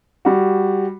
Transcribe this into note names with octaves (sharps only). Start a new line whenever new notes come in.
G3 F#4